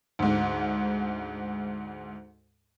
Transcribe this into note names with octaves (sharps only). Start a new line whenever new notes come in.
D2 G#2